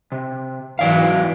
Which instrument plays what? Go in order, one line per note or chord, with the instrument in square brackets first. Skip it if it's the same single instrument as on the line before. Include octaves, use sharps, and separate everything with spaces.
[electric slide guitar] C3
[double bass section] G#2 E3 [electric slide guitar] F#3 D5 F5